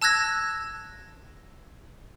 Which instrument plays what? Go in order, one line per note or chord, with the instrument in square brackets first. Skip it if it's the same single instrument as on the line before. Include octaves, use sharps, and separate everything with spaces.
[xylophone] A5 E6 F#6 G#6 A#6